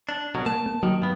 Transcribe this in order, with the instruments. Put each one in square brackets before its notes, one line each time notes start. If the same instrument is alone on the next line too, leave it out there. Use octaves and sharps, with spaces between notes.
[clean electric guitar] D4
C2 B2 F#3
[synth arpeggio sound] A#3 [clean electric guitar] A5
[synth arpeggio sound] A#3
[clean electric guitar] D#3 [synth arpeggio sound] F#3
[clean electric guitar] G2 B3